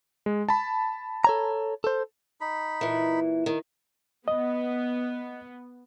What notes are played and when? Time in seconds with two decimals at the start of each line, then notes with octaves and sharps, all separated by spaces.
0.26 G#3
0.49 A5 B5
1.25 A4 C#5 A#5
1.84 A4 C5
2.41 D#4 B5
2.81 A#2 E3
3.46 D#3
4.28 B3 D#5